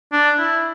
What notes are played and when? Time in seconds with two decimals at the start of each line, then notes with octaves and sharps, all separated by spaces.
0.12 D4
0.39 E4